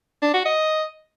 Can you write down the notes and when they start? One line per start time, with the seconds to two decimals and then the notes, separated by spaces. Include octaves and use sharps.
0.22 D4
0.34 F#4
0.46 D#5